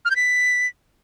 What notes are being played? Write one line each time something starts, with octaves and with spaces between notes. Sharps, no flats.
F6
G6
B6